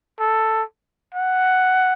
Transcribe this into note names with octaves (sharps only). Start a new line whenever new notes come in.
A4
F#5